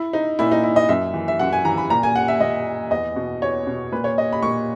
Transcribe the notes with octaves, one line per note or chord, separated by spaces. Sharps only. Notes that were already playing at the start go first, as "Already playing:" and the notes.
Already playing: E4
D#4
A#2 E4
D#4
E4
D#5
F#2 E5
E3
E5
F#2 F#5
G#5
E3 A#5
B5
A#2 A#5
G#5
F#5
E5
A#2 D#5
E2 D#5
B2
E2 C#5
B2
A#2 B4
C#5
D#5
B5
A#2 C#6